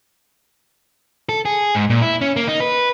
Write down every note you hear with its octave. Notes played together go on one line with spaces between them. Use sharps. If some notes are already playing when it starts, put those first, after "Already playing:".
A4
G#4
G#2
A#2
E4
C#4
A#3
D#4
B4